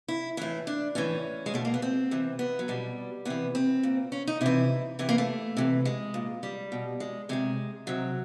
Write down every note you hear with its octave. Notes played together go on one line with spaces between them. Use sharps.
E4
A2 E3 E4
D4
A2 E3 C#4
G#3
B2 A3
A#3
B3
C4
C3 E3
B3
F#3
B2 G3
C3 E3 B3
C4
A#2
C#4
D#4
C3 E3 E4
C3 E3 E4
A#3
A3
C3 E3
G#3
A#2
G3
B2
G#3
C3 D#3 G#3
C3 D#3 F#3